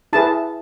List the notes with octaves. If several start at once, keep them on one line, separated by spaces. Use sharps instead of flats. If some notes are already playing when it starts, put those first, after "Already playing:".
E4 G#4 B4 A5